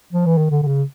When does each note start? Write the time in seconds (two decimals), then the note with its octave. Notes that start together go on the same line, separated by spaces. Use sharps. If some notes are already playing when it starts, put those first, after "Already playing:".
0.12 F3
0.26 E3
0.37 D#3
0.51 D3
0.63 D3
0.67 C#3